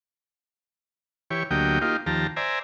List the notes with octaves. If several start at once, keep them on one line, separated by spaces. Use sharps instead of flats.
E3 G4 C#5
D2 F#3 A#3 G4 D#5 G5
A#3 D#4 F4 G4
D#2 F3 G4 A5 A#5
C5 D5 E5 G#5 A#5